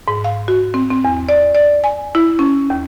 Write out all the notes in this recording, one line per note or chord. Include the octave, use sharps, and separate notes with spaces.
G#2
F5
F#4
C4
C4
E2
D5
D5
G#5
E4
C#4
D#2